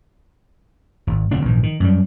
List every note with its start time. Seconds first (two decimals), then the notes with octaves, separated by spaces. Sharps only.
1.07 G#1
1.31 F1 D3 C4 D4
1.45 A#1 G#2 E3
1.63 D#3
1.80 F#2 G3